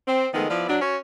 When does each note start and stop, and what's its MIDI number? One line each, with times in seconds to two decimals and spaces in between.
0.07 0.28 60
0.33 0.48 51
0.33 0.48 53
0.33 0.48 56
0.33 0.48 57
0.33 0.48 59
0.49 0.68 53
0.49 0.68 59
0.49 0.68 64
0.49 0.68 74
0.69 0.76 54
0.69 0.76 62
0.81 0.96 61
0.81 0.96 66
0.81 0.96 73